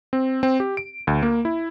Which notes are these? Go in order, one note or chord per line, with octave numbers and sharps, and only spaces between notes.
C4
C4
G4
D7
D2
A#3
E4